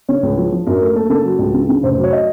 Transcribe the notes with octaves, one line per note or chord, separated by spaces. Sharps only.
C#3 C#5
C#2
F3
F3
F#2 A#4
A3
A#3 A4
C#3 A4
F#3
C#2
C#3
C#3
F1 C5
F#3
C#5
D#5